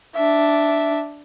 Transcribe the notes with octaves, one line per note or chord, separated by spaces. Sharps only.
D4 E5